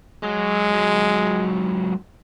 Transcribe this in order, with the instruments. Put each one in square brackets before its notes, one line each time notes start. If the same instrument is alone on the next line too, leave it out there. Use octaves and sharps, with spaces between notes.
[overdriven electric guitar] F#3 [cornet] G#3
[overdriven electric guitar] G#2 F#3